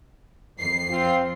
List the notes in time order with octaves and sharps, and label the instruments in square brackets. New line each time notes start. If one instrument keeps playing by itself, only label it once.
[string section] F2 C7
[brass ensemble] C4 F4